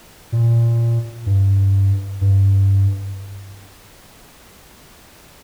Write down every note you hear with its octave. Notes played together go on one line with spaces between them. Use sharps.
A#2
G2
G2